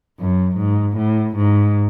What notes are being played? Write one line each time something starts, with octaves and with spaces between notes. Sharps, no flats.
F#2
G#2
A2
G#2